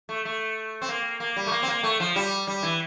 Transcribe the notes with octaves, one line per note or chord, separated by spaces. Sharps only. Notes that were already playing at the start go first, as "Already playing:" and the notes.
A3
A3
C4
A#3
A#3
G3
A3
A#3
C4
A#3
A3
F3
G3
G3
E3